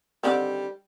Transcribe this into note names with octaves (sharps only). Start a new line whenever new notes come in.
D3 D#3 G3 C4